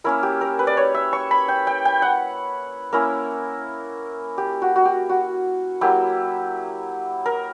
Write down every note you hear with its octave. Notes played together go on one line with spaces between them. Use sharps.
A#3 C#4 E4 A#4
G4
A#4
B4
D5
C#5
E5
C#6
B5
G5
G5
G5
F#5
A#3 C#4 E4 A#4
G4
F#4
F#4
G4
F#4
F#3 A#3 E4 G4
A#4